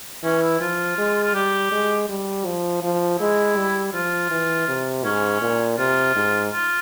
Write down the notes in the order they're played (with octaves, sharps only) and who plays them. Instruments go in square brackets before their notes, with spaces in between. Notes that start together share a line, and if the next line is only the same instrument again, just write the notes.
[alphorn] E3 [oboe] C#4
[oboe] E4
[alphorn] F3 [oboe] F4
[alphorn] G#3
[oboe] F4
[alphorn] G3 [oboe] G4
[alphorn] G#3
G3
F3
F3
[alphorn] G#3 [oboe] E4
[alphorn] G3
[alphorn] F3 [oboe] F4
[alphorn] E3
C3
[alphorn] G#2 [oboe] C#4
[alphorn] A#2
[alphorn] C3 [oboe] F4
[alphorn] G#2
[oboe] F4